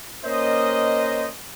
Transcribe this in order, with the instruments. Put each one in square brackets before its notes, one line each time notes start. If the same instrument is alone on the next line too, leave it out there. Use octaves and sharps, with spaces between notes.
[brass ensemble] A#3 C#4 C5 D#5